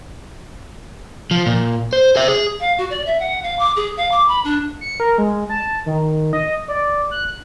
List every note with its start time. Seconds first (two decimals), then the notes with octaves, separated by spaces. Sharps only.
1.31 F3
1.46 A#2
1.93 C5
2.16 C5 E5
2.28 G#4
2.60 F5
2.78 F#4
2.90 D5
3.06 E5
3.20 F#5
3.43 F5
3.59 D6
3.76 G#4
3.97 F5
4.11 D6
4.28 B5
4.44 D4
4.81 C#7
5.00 A#4
5.18 G#3
5.50 A5
5.86 D#3
6.33 D#5
6.68 D5
7.11 F#6